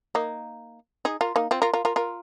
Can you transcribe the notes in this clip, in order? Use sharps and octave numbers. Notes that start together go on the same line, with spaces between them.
A#3 D#4
D#4 G#4
F4 A#4
A#3 D#4
C4 F4
F4 A#4
F4 A#4
F4 A#4
F4 A#4